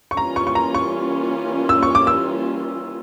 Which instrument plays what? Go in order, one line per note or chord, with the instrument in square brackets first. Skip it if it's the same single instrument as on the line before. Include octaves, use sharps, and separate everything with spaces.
[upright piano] C#6
[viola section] E3 G3 A#3 C#4 F4 [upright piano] A#5
[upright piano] C#6
C#6
A#5
C#6
E6
C#6
D6
E6